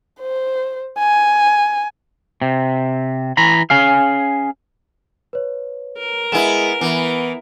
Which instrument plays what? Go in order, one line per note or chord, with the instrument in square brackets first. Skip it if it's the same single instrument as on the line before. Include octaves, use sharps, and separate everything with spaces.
[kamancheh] C5
G#5
[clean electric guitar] C3
E3 A#5 B5
C#4 G#4 F5
[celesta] B4 C#5
[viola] A#4
[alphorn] G#3 [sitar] B3 E4 [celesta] B4 G#5 E7
[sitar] E3 [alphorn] B3